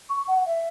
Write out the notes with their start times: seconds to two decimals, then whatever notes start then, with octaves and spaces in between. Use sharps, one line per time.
0.09 C#6
0.27 F#5
0.45 E5